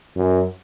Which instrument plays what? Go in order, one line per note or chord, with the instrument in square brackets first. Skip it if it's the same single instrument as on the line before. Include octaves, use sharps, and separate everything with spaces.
[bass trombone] F#2